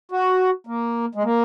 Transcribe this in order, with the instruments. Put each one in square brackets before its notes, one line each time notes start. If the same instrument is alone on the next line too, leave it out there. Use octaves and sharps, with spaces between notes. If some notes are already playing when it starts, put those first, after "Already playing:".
[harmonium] F#4
A#3
G#3
A#3